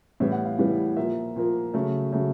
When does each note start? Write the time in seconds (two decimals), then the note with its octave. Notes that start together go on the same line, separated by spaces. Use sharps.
0.20 A2 E3 G3 B3 E5
0.32 F#5
0.45 F5
0.59 A2 E3 G3 B3
0.97 A#2 F3 A#3 E5
1.36 A#2 F3 A#3
1.74 C#3 F#3 A3
2.13 C#3 F#3 A3